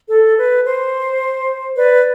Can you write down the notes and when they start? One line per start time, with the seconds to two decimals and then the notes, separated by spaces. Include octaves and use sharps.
0.09 A4
0.37 B4
0.65 C5
1.76 B4 D5